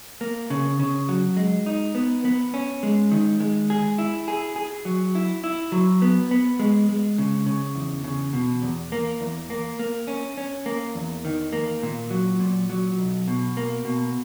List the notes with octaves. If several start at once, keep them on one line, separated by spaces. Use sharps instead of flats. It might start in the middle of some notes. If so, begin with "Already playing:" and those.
A#3
C#3
C#3
F#3
G#3
D#4
B3
B3
C#4
G#3
D#3
G#3
G#4
E4
G#4
G#4
F#3
E4
E4
F#3
B3
B3
G#3
G#3
C#3
C#3
E2
C#3
B2
E2
A#3
E2
A#3
A#3
C#4
C#4
A#3
E2
D#3
A#3
A#2
F#3
A#2
F#3
B1
B2
A#3
B2